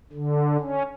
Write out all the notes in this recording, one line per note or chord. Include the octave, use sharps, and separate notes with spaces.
D3
C#4